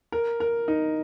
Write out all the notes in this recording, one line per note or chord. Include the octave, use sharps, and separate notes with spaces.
A#4
A#4
D#4